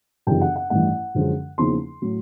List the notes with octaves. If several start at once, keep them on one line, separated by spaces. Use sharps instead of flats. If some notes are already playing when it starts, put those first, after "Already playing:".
G1 F#2 C#3 E3 G3 G5
F#5
F#5
A1 G2 E3 F#5
F#2 D3 F3 G#3 C#4
E2 C#3 F3 A#3 D#4 C6
A2 F#3